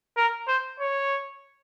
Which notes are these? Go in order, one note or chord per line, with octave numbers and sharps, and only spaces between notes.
A#4
C5
C#5